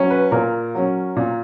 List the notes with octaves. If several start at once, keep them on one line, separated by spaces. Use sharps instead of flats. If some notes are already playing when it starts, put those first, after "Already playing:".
Already playing: F#3 C#4
B4
A#2 A#4
F#3 C#4
A#2